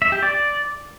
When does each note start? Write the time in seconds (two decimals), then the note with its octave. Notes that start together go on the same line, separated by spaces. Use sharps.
0.02 E5
0.12 G4
0.23 D5